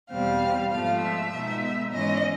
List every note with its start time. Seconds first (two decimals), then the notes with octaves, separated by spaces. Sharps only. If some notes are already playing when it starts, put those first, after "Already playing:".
0.11 E2 B2 G3 C4 F5
0.72 G#2 F3 A3 F5
1.02 E5
1.33 B2 G#3 B3 D#4
1.93 G#2 E3 G#3 C#4 D#5